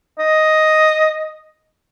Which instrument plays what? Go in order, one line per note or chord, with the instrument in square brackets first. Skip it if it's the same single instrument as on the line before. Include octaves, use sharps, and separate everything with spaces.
[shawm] D#5